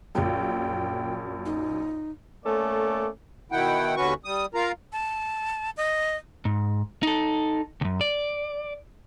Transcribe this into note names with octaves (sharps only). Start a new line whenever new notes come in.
A#1 F#2 G5
D#4
A3 A#3 C#4 A4 D5
B2 D#3 E4 F#5 G5
D#2 D3 C#4 F#4 B4 C#6
G3 D#6
F4 A#4 F5 A#5
A5
D#5
G#2
D#4 A4
C#2 F#2
D5